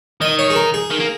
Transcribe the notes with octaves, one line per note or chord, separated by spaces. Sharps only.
D#3 D#5
C#5
G#4
A#4
G#4
D#3
A#3